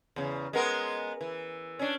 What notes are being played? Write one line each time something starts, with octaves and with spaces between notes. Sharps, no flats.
E2 C#3
G#3 B3 A#4
E3
C#4 D4